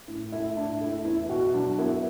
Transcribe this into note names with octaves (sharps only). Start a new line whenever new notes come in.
A2
A3 E4
A2 D4
A3 E4
E2 E4
B2 F#4
F#3 D4
B3 E4